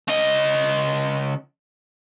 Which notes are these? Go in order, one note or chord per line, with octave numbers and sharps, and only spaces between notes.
C#3 D#5